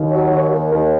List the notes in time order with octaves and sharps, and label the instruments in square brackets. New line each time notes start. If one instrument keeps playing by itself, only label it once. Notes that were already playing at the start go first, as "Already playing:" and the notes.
Already playing: [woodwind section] D#2 [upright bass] D#3
[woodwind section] F#3
D#2
D#2
D#2